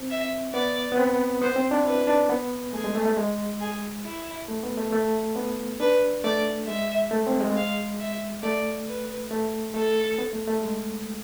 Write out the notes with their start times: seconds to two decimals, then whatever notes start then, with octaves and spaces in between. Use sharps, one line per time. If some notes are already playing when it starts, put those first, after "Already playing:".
Already playing: C4
0.11 E5
0.54 B3 D5
0.92 B3
0.98 C4
1.42 B3 C5
1.56 C4
1.71 D4
1.85 E4 B4
2.07 D4
2.30 B3
2.73 A3 G#4
2.84 G#3
2.95 A3
3.06 A3
3.17 G#3
3.60 G#4
4.05 E4
4.48 A3
4.63 B3
4.77 A3
4.92 A3
5.36 B3
5.80 D4 B4
6.24 A3 D5
6.68 G#3 E5
7.11 A3
7.27 C4
7.41 G#3
7.56 F5
8.00 E5
8.42 A3 D5
8.87 B4
9.31 A3
9.74 A3 A4
10.18 B3
10.33 A3
10.48 A3
10.62 G#3